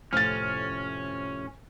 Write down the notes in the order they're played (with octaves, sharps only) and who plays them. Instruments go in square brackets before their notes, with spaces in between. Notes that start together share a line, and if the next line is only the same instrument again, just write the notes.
[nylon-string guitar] F2 A2 C3 [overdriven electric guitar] C#4 [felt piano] F6 A6